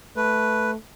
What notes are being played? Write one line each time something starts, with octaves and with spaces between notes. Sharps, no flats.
A3 B4